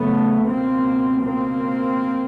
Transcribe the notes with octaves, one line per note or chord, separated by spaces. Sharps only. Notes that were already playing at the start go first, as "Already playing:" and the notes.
Already playing: F#2 C#3 A3 B3
C#2 B2 A#3 C4
A#3 C4